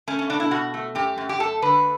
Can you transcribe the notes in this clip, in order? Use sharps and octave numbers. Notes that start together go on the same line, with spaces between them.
A3 C#4
C#4
B2 D4
E4
B2 F#4
A3
F#2 G4
F#2
G4
A3 A4
D3 B4